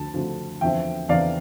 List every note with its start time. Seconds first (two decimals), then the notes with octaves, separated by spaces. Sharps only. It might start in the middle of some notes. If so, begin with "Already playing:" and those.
Already playing: D2 D3 F3 A5
0.14 D2 D3 F3
0.61 E2 D3 F3 E5 G5
1.09 E2 D3 F3 D5 F5